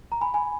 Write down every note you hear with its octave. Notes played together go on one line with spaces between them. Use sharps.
A#5
G#5 B5
G#5 B5